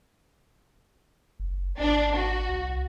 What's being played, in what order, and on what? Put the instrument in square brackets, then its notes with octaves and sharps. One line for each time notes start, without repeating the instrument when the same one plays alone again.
[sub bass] F#1
[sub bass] G#1 [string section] D4
[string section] F#4
[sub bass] C2